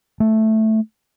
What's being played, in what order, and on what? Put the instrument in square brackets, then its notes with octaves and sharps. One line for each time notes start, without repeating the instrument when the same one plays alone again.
[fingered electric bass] A3